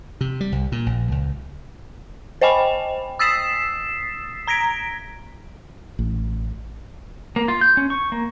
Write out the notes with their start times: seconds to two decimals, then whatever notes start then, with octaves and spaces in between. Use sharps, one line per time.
0.21 C3
0.41 G3
0.52 C2
0.72 A#2
0.86 A#1
1.12 C#2
2.41 C5 D#5 G5 G#5 B5
3.19 D#6 E6 A6 B6 C7 E7
4.47 A#5 G#6 A#6 B6 D7
5.99 A1
7.36 A#3
7.48 F4
7.61 G6
7.77 C#4
7.90 C#6
8.12 A#3